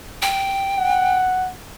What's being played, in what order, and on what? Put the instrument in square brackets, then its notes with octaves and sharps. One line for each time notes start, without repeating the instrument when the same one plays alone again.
[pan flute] G5
[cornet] F#5